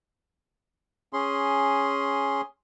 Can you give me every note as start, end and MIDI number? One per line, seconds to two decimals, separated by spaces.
1.13 2.41 61
1.13 2.41 68
1.13 2.41 84